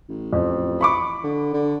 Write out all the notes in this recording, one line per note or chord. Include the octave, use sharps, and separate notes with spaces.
A1
F2
B5 C#6 D6
D3
D3